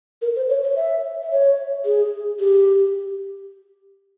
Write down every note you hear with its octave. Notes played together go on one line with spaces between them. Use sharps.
A#4
C5
C#5
C#5
E5
E5
C#5
G#4
G4